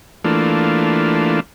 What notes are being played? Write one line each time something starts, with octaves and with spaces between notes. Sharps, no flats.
E3 A3 A#3 D4 F4